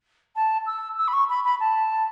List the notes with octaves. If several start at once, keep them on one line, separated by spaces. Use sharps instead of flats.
A5
E6
E6
B5
C#6
B5
B5
A5